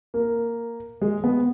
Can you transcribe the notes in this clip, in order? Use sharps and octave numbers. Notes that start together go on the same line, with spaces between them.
A#3
G#3
B3